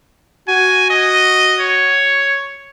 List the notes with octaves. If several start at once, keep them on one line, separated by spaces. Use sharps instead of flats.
F#4 G#5
D#5
C#5